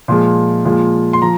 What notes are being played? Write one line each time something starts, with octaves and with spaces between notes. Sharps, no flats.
A#2 F3 G#3
A#2 F3 G#3
C6
F3 A#5